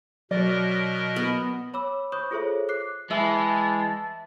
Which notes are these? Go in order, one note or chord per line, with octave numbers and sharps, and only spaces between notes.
B2 F#3 A#4 D5 D#5
B3
C#5 B5 D6 E6
C5 B5 C#6 D#6 G6
F4 G#4 A4 C5 C#5 E5
D6 F#6 C7
E3 G#3 E5 A5